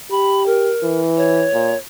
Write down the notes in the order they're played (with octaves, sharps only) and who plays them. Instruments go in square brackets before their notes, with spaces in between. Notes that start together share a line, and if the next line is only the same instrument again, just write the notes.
[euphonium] G4 [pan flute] B5
[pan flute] A#4
[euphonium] E3
[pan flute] C#5
[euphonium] A#2